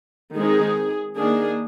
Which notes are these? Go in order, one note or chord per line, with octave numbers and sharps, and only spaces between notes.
D#3 G#3 C4 D#4 G#4
D#3 A#3 D4 G#4